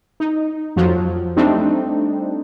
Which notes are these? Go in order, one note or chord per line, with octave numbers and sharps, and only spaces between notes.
D#4
F2 F3 F#3
G3 A3 C4 D4 D#4